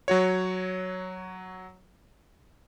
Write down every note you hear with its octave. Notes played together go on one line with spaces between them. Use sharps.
F#3 F#4 C#5